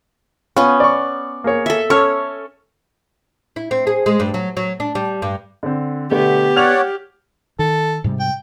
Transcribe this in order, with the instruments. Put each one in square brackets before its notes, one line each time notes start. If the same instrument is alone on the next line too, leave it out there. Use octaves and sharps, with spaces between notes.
[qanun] B3 C#4 [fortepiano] F4
[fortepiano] D5 C#6
A#3 G#4 C#5
[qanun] A4 E5
[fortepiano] C#4 A4 F6 [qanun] C#5
[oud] E4
C4
G#4
G#3
G2
F#3
F#3
D4
G3
G2
[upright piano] D3 C4
[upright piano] B2 D3 A3 [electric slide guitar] B3 [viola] G4
[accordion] C#5 D5 F#5 [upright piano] F6 F7
[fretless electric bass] D#3 [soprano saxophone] A4
[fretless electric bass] G#2 C3 G3
[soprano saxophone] G5